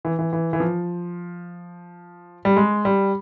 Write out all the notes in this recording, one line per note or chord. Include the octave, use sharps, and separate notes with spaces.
E3
E3
E3
E3
F3
G3
G#3
G3